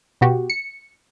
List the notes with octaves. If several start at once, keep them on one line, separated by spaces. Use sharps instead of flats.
B2 B3 F#4 G4
C#7